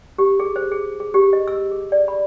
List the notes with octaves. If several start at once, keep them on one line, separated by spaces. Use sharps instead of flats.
G4
G#4
C5
G#4
G#4
G4
D#5
E6
G#4
D5
B5